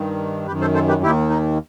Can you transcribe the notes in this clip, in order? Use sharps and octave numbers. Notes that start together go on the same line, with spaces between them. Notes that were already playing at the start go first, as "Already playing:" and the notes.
Already playing: G2 D#3
F#2 D#3 G4 B4
A4 C5
A4 C5
G4 B4
D#2 D#3 E4 G4
D#4